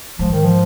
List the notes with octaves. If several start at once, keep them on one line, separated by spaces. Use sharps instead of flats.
G#2 F3
D#3
F3